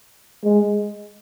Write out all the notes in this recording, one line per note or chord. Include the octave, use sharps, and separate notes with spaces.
G#3